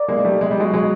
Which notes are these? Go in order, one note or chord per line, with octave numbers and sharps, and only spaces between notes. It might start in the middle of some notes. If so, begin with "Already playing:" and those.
Already playing: A#4 D5
G#3 A#3
G3 A3
G#3
G3
F#3 G#3
F#3 G#3